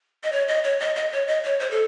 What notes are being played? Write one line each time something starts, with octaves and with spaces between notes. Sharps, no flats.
D#5
C#5
D#5
C#5
D#5
D#5
C#5
D#5
C#5
C5
A4